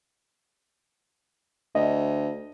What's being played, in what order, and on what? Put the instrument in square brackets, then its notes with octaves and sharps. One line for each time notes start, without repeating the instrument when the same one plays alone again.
[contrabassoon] D2 [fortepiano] D#5